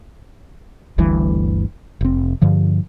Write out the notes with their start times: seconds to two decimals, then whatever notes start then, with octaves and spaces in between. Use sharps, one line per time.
0.98 G1 D2 G2 E3
2.01 F1 C4
2.42 G2 D3 F3